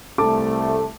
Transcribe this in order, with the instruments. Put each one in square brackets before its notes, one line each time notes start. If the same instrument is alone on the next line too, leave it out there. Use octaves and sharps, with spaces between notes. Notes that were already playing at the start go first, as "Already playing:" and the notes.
[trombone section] C2 A3 [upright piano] A4 A5 D6